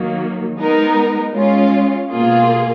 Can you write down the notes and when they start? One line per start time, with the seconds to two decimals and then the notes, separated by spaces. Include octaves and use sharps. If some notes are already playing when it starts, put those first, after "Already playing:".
Already playing: D#3 F#3 A#3
0.57 G#3 B3 D#4 A#4
1.34 G#3 C#4 F4
2.10 B2 A#3 F4 G#4